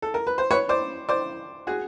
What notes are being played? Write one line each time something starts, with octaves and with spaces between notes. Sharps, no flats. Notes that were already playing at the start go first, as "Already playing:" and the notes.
A4
A#4
B4
C5
B4 C#5
C5 D5
C5 D5
F#4 G#4